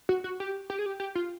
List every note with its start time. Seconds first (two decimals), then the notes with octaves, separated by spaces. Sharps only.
0.09 F#4
0.24 F#4
0.40 G4
0.70 G4
0.79 G#4
0.86 G4
1.00 G4
1.15 F4